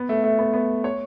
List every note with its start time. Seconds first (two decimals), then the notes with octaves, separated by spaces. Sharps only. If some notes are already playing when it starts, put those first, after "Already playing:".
Already playing: B3
0.09 A3
0.24 A3
0.39 B3
0.54 B3
0.84 C#5